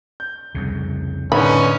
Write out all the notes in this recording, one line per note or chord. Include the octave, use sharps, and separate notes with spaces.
G6
C2 F2 C#3
A2 D3 B3 C#4 D#4 B5